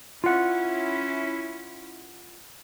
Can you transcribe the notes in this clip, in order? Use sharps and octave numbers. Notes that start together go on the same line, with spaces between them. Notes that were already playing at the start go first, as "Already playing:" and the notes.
C#4 E4 F4 F#5